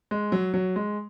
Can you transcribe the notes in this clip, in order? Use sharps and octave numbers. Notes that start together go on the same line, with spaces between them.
G#3
F#3
F#3
G#3